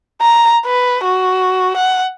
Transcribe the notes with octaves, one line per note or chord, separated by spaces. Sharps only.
A#5
B4
F#4
F#5